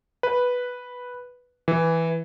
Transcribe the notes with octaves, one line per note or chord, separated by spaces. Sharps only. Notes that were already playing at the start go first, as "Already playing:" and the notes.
B4
E3